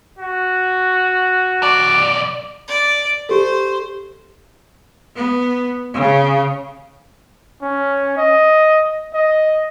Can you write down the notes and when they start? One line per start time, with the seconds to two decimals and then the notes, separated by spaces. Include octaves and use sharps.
0.18 F#4
1.63 B1 D5
2.68 D5
3.29 G4 A4 C5
5.16 B3
5.94 C#3
7.62 C#4
8.17 D#5
9.13 D#5